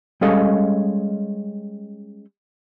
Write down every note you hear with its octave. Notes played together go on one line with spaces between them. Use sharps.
G3 G#3 C#4 A4 D#5 F5